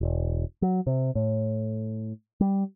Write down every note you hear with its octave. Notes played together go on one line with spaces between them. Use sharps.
E1
F#3
C3
A2
G3